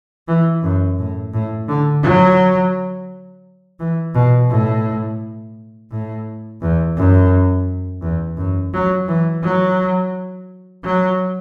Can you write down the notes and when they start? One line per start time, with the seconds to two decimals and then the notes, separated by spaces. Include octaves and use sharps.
0.28 E3
0.63 F#2
0.99 A2
1.34 A2
1.69 D3
2.04 F#3
3.80 E3
4.15 B2
4.50 A2
5.91 A2
6.62 E2
6.97 F#2
8.02 E2
8.37 F#2
8.73 F#3
9.08 E3
9.43 F#3
10.84 F#3